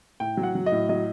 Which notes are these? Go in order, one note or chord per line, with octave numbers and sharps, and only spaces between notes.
A2 G5
F#3
F#5
F#3
D#5
A2
F#3 D#5